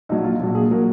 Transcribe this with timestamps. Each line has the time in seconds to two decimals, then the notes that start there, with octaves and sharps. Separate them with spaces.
0.09 A#1 A#2 F#3 D#4
0.24 F4
0.40 A#1 A#2 F#3
0.55 G#4
0.71 A#2 F#3 A#4